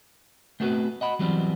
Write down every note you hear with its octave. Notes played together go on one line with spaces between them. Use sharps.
A3 B3 C4 F#4 A4 B4
D#5 F#5 B5
E3 F#3 G3 B3 C4 F4